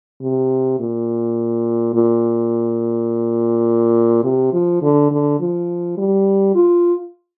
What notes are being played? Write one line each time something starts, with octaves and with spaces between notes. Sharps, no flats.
C3
A#2
A#2
C3
F3
D3
D3
F3
G3
F4